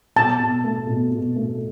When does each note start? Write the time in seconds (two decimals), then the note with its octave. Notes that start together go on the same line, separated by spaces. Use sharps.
0.16 B2 A5
0.39 B2
0.64 A3
0.87 B2
1.11 B2
1.36 A3